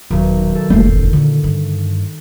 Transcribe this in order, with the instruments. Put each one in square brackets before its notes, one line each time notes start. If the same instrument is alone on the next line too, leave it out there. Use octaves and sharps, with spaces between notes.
[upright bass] D#1 [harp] B1 D#3
[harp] A4
[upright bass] F1 C#4 [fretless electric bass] G3 A3 A#3 [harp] G6 C7
[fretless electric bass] A1 E2
[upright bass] A#2 [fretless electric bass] D3
[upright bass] G2